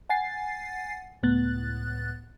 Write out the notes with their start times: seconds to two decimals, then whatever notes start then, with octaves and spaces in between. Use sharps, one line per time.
0.09 F#5 G#5 A6 C7
1.23 C#2 A2 B3 F#6 A6